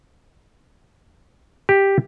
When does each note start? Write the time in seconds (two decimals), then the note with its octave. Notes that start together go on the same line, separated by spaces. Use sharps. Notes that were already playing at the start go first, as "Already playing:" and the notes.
1.69 G4